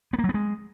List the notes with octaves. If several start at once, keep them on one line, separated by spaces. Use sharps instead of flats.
B3
A#3
F#3
B3
G#3